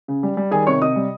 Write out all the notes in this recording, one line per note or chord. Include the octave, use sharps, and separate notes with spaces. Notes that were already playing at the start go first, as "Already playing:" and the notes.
C#3
G3
G3
D#3 G#4 G#5
C3 C#5 C#6
C3 D#5 D#6
G3